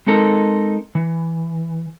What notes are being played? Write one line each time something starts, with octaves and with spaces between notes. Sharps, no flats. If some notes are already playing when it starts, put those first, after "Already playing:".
G#3 C4 D#4 A4 A#4
E3